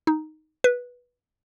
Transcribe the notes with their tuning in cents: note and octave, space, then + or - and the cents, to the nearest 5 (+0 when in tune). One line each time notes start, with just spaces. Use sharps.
D#4 +0
B4 -15